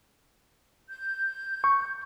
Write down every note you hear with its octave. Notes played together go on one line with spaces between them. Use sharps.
G6
C#6